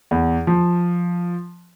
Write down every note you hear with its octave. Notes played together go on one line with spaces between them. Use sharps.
E2
F3